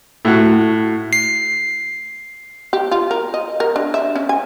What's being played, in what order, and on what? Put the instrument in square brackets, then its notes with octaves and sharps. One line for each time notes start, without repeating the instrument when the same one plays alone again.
[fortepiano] A2 F#4
[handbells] C7
[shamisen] G4
F4
A#4
D#5
A#4
D4
E5
C#4
G#5